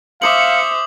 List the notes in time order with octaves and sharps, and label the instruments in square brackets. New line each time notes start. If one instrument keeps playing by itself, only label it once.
[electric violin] C5 E5 [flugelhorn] F5 [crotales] D6 D#6 F#7 [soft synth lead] C#7